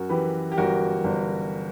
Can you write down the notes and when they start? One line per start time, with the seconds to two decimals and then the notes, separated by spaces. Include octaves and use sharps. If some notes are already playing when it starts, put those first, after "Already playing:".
Already playing: F#2 F#4 A#4
0.09 E3 G4 B4
0.52 G4
0.57 G1 F#4 A#4
1.04 G1